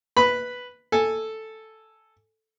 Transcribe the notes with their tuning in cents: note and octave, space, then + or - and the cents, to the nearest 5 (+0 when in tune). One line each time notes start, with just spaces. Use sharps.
B4 +0 B5 +0
A4 +0 G#5 +0